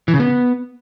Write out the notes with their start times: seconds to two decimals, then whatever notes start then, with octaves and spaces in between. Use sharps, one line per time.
0.08 E3
0.14 C#3
0.19 B3